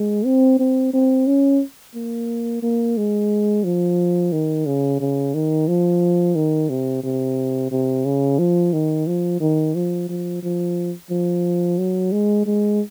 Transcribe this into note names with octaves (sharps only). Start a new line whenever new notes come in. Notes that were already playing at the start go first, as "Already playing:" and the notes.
Already playing: G#3
C4
C4
C4
C#4
A#3
A#3
G#3
F3
D#3
C#3
C#3
D#3
F3
D#3
C3
C3
C3
C#3
F3
D#3
F3
D#3
F3
F3
F3
F3
F#3
G#3
G#3